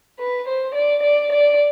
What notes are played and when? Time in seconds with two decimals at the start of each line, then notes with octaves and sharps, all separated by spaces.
0.18 B4
0.47 C5
0.75 D5
1.03 D5
1.31 D5